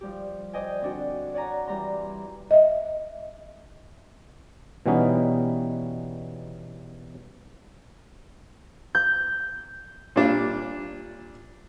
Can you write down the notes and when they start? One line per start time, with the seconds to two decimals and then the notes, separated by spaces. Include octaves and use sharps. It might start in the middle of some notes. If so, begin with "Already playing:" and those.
0.01 F3 G3 G4
0.53 C5 D5 D#5 G5 G#5
0.81 D3 C4 D4 F#4
1.34 C#5 D5 F#5 G#5 A#5
1.67 E3 G3 A#5 C6
2.51 D#5 E5
4.86 B2 E3 G3 B3 C#4 D#4
8.95 G6
10.16 A#2 G3 D4